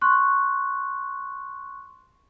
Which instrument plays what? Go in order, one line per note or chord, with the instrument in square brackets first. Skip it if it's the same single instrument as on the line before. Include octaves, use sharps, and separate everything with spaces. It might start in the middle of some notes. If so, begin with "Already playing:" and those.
[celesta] C6 C#6 F#6